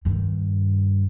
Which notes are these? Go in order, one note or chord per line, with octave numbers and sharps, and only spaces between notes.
G2 D#3